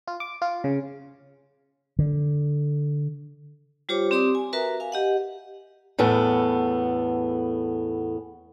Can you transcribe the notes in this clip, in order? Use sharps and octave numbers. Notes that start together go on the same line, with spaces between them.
F4
D6
F4
C#3
D3
G3 F4 G4 C5 C#5 D6
C4 G4 D5 C6 D6 D#6
G#5
F#4 A#4 B4 E5 A#5
F5 G#5
G4 D#5 F#5
E2 A2 B3 A4